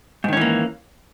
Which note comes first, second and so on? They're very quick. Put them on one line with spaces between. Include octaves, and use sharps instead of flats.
G#2 D#3 C#4 E3 A#3